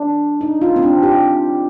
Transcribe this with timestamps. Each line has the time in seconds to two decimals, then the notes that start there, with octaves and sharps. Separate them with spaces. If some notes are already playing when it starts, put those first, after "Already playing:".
Already playing: D4
0.41 D#4
0.62 F4
0.76 C4
0.83 D4
1.03 G4